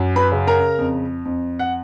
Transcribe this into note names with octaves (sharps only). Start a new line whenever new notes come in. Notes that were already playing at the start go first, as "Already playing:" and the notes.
Already playing: F#2
B4 B5
C#3
A#4 A#5
F2
F2
F#5